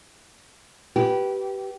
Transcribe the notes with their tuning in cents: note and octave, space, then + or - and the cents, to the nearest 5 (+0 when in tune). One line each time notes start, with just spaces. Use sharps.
G4 -20 B4 -10